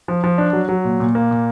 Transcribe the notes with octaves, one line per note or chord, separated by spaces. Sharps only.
F3
F3
D4
F#3
F#3
A#2
A#2
A#3
A#2